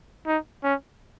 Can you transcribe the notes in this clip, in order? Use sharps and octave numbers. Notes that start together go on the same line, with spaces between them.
D#4
C#4